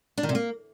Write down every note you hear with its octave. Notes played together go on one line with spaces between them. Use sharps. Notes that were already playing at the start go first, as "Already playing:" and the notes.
D4
D#3
C3
A#3